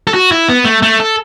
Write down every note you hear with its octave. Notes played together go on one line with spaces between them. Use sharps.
A4
F#4
E4
B3
A3
A3
A4